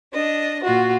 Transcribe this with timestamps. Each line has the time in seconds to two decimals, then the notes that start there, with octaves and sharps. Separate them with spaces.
0.14 D4 D#5
0.64 A#2 F4 F#4